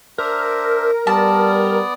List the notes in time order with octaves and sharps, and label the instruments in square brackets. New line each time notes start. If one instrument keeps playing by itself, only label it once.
[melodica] D4 C5 E5 [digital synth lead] A#4
[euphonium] G3 [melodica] B3 D5 [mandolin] A5